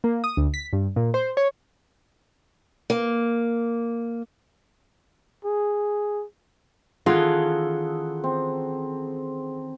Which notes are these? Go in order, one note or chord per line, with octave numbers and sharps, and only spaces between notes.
A#3
D#6
D2
B6
G2
A#2
C5
C#5
A#3
G#4
D#3 E3 C#4 F4 G#4 A4 F#5 C6
C4